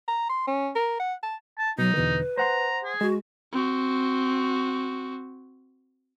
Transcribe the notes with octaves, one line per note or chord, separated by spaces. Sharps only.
A#5
C6
C#4
A#4
F#5
A5
A5
B2 F#3 D#4
E2 B2 D3 B4
C5 F#5 A#5 C6
G#4
G#3 F#4
C4 F#4